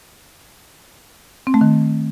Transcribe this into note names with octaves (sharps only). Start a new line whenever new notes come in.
C4
A3
D#3